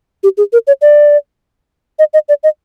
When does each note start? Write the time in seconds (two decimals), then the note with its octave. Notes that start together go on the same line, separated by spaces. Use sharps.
0.23 G4
0.37 G#4
0.53 A#4
0.67 C#5
0.82 D5
1.99 D#5
2.14 D#5
2.29 D5
2.43 D#5